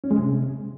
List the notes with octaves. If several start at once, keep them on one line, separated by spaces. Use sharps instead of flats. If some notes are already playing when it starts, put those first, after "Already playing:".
C#4
G#3
C3